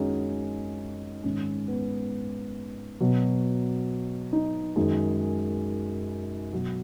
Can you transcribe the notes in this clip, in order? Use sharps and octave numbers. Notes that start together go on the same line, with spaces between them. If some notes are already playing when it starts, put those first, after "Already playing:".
Already playing: F#2 D#3 G#3 C#4 D#4 F#4 G#4
G#2 D#3 G#3 C#4
B3
B2 F#3
D#4
F#2 D#3 G#3 G#4
B2 F#3 F#4